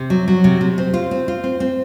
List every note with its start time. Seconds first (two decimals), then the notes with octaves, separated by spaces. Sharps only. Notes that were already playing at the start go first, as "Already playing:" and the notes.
Already playing: C3
0.10 F#3
0.28 F#3
0.44 C3
0.61 C3
0.78 C4
0.94 F4
1.11 C4
1.28 F4
1.44 C4
1.60 C4